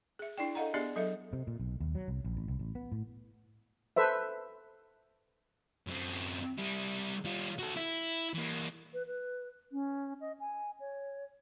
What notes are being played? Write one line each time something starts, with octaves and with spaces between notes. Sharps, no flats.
G#4 E5
D4 E4 D5 G5
A4 D#5 F5 F#5 A#5
B3 D4 G4 G#4 D5 E5
F#3 A4 D#5 E5
C3
A#2
B1
D#2
F#3
C2
A#1
A1
C2
A1
B3
A2
A4 B4 C5 E5
F#2 C4
G3 E4
G3 F4
F#4 A4
E4
E3 A#3
B4
B4
C#4
D#5
G#5
C#5